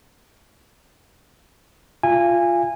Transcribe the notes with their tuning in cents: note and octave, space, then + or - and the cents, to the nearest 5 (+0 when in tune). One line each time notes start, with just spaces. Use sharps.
F4 +0 F5 -35 G#5 -20